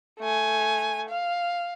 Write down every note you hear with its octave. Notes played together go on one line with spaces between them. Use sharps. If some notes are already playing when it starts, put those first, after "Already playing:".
A3 G#5
F5